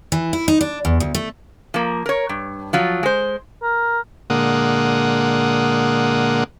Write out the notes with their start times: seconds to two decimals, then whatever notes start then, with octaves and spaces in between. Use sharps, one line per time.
0.12 E3
0.33 E4
0.48 D#4
0.61 D4
0.85 E2
1.00 D2
1.15 A3
1.74 F3 A#3
2.06 A#4 C#5
2.29 G2
2.73 F3 F#3 F4
3.03 G#3 C5
3.62 A#4
4.30 A#2 D3 G#3 A#3 F#5 D#6